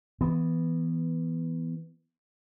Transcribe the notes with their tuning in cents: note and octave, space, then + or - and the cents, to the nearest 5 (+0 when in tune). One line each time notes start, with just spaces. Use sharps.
E3 +0 B3 +0